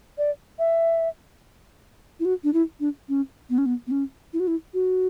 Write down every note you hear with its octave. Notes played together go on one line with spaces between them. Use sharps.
D5
E5
E4
F#4
D4
E4
D4
C#4
B3
C#4
B3
B3
C#4
E4
F#4
E4
F#4